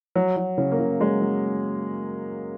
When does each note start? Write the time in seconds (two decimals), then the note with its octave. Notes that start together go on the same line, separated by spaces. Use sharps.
0.15 F#3
0.36 F#3
0.58 C#3
0.72 A#3
0.79 C#3
1.00 F#3 G#3
1.21 F#3